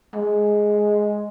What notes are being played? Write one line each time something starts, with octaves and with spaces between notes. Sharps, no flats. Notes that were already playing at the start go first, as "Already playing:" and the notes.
G#3